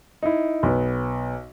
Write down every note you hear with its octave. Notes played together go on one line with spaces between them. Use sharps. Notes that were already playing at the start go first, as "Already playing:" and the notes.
D#4 E4
B1 B3